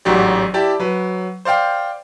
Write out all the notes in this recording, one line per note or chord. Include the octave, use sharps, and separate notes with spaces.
A1 G#2 F#3 F#4 G4 D5
E4 G4 D5 A5
F#3 B4
C5 D5 F5 G5